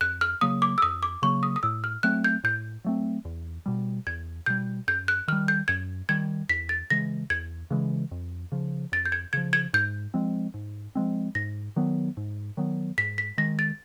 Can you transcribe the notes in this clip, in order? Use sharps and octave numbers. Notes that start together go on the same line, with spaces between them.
F2 F#6
F6
C#3 F#3 A#3 D#6
D6
E6
F2 D#6
D6
C#3 F#3 A#3 C#6
D#6
D#6
A2 E6
F6
F#3 A3 C4 F#6
G6
A2 G6
F#3 A3 C4
E2
B2 G3
E2 G#6
B2 G3 G6
F#2 G6
F#6
D#3 G3 F6
G6
F#2 G#6
D#3 G3 G#6
E2 B6
A6
C#3 E3 G#3 A#6
E2 G#6
C#3 E3 G#3
F2
C#3 F3
F2 A6
G6
G#6
C#3 F3 G#6
G#6
G#2 G6
F3 G#3 C4
G#2
F3 G#3 C4
G#2 A#6
D#3 F#3 B3
G#2
D#3 F#3 B3
G#2 B6
B6
D#3 G#3 A#6
A6